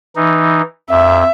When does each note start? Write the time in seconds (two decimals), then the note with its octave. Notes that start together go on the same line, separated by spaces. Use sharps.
0.16 E3 D#4
0.90 F2 E5